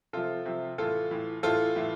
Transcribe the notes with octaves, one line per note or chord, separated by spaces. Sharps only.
C3 F3 F4 A4
C3 F3
A2 E3 F4 A4
A2 E3
A2 E3 F4 A4
A2 E3